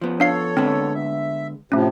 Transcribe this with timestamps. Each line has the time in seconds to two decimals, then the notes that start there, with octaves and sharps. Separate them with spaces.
0.01 F3 B3
0.20 D4 A4 C#5 F5 C7
0.57 D3 G#3 B3 C4
0.94 E5
1.72 A2 C3 F3 A3 C#4